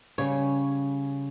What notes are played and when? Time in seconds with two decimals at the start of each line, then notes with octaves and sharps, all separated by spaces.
0.18 C#3 G3 C#4 C#5